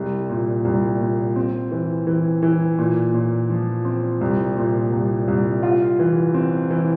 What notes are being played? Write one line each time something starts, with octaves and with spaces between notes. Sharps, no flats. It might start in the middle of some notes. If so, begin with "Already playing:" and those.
Already playing: C2
A#2
C2
A#2
C4
E3
E3
E3
A#2
A#2
F3
C4
C2
A#2
C2
C2
F4
E3
C4
E3